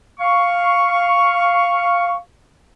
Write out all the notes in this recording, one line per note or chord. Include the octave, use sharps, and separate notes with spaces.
F5 C#6